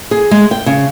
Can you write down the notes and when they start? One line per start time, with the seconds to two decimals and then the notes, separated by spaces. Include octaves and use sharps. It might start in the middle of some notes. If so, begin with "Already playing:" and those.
0.11 G#4
0.31 G#3
0.51 G5
0.66 C#3